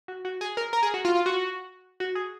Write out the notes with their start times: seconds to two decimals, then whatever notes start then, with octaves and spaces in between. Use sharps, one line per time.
0.08 F#4
0.25 F#4
0.41 G#4
0.57 A#4
0.73 A#4
0.83 G#4
0.94 F#4
1.05 F4
1.15 F4
1.26 F#4
2.00 F#4
2.15 G#4